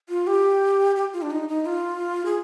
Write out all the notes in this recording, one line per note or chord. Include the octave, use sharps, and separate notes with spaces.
F4
G4
G4
F4
D4
D#4
D#4
F4
G#4